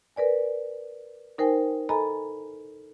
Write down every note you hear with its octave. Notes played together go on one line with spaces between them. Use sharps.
A#4 B4 D5 G#5
D#4 A#4 C5 G5 G#5
A4 D#5 G#5 A#5 B5